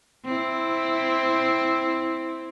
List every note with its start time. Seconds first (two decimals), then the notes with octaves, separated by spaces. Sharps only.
0.25 C4 E4